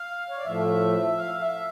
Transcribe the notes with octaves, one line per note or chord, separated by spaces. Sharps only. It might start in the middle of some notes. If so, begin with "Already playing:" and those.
Already playing: F5
C#5
D5
A2 F3 A3 E5
F5
E5